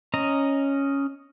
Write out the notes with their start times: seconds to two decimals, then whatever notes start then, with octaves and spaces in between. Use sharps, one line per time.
0.14 C#4 D#5 A#5